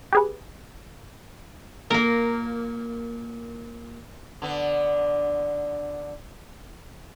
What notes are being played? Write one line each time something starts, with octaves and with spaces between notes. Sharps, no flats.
G4 G#4 B4
A#2 A#3 A#4
D3 B3